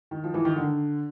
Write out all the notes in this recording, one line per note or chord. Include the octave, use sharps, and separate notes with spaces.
D#3
F3
E3
D#3
D3